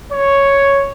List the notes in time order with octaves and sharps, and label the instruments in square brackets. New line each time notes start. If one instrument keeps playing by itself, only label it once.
[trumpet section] C#5